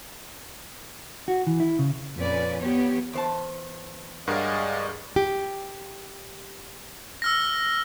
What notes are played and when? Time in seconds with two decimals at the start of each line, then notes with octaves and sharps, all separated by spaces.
1.28 F#4
1.47 E3
1.60 E4
1.79 C#3
2.18 F2 A#2 C#4 B4 D5
2.58 F3 B3 G4 C#5
3.13 E2 C5 A5
4.27 G2 G#3 G#4 A#4 C#5 D5 F5 F#5
5.16 G4
7.22 E6 F6 A#6